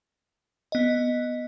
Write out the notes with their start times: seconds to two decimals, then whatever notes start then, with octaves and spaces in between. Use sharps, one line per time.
0.72 B3 D#5